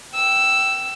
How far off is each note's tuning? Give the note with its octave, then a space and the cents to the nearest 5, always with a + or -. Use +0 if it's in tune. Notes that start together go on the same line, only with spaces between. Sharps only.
G5 -25 E6 +5